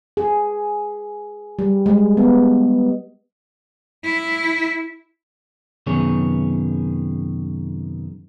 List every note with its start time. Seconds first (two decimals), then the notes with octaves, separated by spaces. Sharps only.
0.17 G#4
1.59 G3
1.86 G#3
2.17 B3
4.04 E4
5.87 F#2 C3 D#3 B3 G#4 C#5